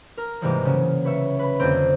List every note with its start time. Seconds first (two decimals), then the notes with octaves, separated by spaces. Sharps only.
0.17 A#4
0.42 G#2 C3 E3 G3 G#3 A#3
0.65 C#3 F#3
1.04 B4 C#5 E5
1.39 B4 B5
1.60 F2 D3 A#3 C4